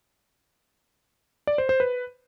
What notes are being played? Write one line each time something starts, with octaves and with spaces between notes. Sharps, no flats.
D5
C5
C5
B4